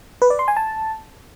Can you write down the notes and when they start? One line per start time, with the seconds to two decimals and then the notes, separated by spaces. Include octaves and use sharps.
0.22 B4
0.30 D5
0.39 C6
0.48 G#5
0.57 A5